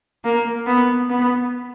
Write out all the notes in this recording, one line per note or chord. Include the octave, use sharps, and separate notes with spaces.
A#3
B3
B3